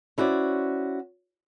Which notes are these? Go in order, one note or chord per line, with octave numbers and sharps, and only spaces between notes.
C#4 E4 F#4 C5 D5